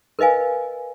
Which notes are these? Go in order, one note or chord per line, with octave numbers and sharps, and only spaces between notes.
A#4 B4 D#5 F5 G#5